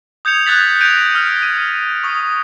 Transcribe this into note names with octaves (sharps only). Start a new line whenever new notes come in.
D#6 G6 G#6 C#7 F7
D#6 F#6 G#6 A6 B6 F#7
G6 G#6 A#6 D7 D#7 F7
D#6 F6
D#7
C#6 D#6